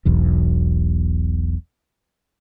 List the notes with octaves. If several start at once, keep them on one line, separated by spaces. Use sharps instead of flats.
E1 B1 E2